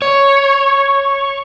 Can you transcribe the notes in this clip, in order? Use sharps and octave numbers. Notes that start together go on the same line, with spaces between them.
C#5